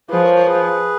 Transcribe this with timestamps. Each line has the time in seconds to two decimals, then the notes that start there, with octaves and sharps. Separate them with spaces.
0.10 F3 G#4 B4
0.23 A#4 C#5
0.34 A#4 C#5
0.46 G#4 B4